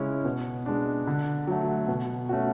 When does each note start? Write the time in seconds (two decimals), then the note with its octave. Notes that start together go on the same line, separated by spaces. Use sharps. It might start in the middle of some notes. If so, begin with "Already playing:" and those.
Already playing: C#3 G#3 C#4 E4
0.25 B2
0.66 G#3 D4
1.07 D3
1.47 F#3 A3
1.88 B2
2.29 A3 C#4 F#4